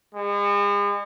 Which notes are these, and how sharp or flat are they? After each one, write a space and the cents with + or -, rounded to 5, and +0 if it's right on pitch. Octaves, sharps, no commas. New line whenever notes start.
G#3 -40